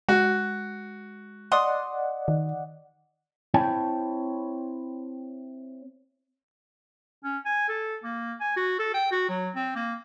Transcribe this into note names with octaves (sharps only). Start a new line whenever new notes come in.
G#3 F#4
D5 D#5 F#5 C6 D#6
D#3
C4 E4 C#5 G5 A5
C#4
G#5
A4
A#3
G#5
F#4
A4
G5
F#4
F#3
C4
A#3